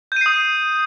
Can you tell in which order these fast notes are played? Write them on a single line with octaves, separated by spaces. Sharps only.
G6 D#7 C7 D#6